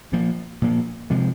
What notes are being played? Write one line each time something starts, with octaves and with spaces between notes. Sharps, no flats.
A#2 F3 A#3
A#2 F3 A#3
C3 F3 G#3